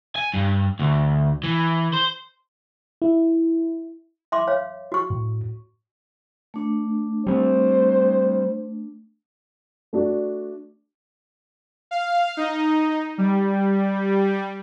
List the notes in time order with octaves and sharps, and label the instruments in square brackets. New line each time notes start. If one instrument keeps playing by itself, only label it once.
[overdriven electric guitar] G#5
G2
D2
E3
C5
[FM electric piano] E4
[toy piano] E5 C6 D6
C#5 F5
F#4 C#6
[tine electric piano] A2
[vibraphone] A3 D4
[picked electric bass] G3 C4 [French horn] C5
[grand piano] A3 D4 F#4 D5
[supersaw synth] F5
D#4
G3